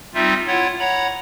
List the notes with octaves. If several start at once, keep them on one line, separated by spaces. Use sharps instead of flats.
G3 C4 D#4 F4 E5
E4 F4 C#5 F#5
C#5 F#5 A#5 B5